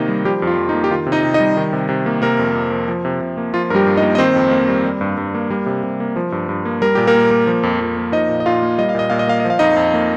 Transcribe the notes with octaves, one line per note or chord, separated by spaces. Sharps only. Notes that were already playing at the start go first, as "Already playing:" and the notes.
Already playing: C3 D#3 A#3 D#4 D#5
G3
F3 G3 G4
F2
F4
F2
D#4
A#3
G4
D#3 F4
C3
D#4 D#5
C3
D#4 D#5
G3
D#3
C3
C3
A#3
C3 A#3 A#4
F2
F2
F3
F3
C3
C3
A#3
F3 F4
G2 G3 G4 A#4
G2
D#4 D#5
A#3
D#5
D#3 C4 C5
F2
A#3
G3
G3
G2
G2
A#3
G3
C3
C3
A#3
F3
G2
G2
A#3
G3 A#4
A#2 G4
A#3 A#4
A#2
A#3
F3
F2
F2
A#3
F3 D#4 D#5
A#2
D#5
A#2 F4 F5
A#3
G3 D#5
F5
A#2 D#5
A#2 F5
D#5
A#3 F5
F3 D#5
F5
F2 D#4 D#5
F2
A#3